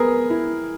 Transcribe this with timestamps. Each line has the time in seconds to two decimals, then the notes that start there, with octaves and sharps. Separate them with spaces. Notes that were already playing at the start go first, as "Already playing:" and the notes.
Already playing: B3 G#4 A#4
0.30 E4